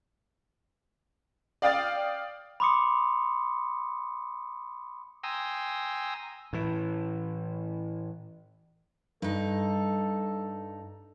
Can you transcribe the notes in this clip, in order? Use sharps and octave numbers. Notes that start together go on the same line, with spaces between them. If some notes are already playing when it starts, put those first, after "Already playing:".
D5 F5 G5 D#6 F6 A6
B5 C6 D6 D#6 C#7
G5 G#5 A#5 C6 D#6 E6
A2 E3
G2 D#4 A4